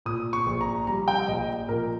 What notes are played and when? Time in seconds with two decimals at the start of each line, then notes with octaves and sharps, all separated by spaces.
0.06 A#2 D#6
0.33 C#6
0.46 A#1
0.61 A#5
0.87 G3 A#5
1.08 G5
1.28 A#1 D#5
1.68 A#2 A#4